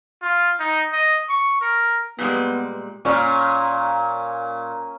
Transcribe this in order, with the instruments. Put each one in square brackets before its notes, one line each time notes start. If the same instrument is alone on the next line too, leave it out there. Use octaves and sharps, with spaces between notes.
[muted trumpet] F4
D#4
D#5
C#6
A#4
[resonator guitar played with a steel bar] A#2 G3 G#3 [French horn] B3
[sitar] A#2 [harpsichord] C#4